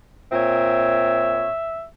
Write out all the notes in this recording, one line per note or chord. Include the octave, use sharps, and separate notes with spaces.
A#2 C4 C#5 E5